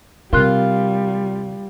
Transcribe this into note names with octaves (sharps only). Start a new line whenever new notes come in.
C3 G3 F4 A#4 C6 F#6